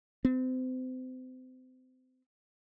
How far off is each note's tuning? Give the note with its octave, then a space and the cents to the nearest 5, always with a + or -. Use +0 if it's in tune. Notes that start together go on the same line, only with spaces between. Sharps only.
C4 -35